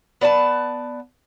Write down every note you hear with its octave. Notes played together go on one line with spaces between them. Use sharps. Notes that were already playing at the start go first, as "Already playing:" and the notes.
B3 D5 G5 A5